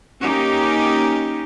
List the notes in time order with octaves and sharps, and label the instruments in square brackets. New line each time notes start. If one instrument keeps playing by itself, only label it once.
[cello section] A#3 C#4 D#4 G4